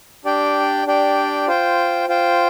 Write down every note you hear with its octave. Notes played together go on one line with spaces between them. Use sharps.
D4 G4 D5 G5
D4 G4 D5 G5
F4 C5 G5
F4 C5 G5